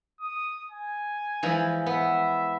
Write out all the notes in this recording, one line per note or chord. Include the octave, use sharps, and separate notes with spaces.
D#6
G#5
E3 F3 G#3
B3 E5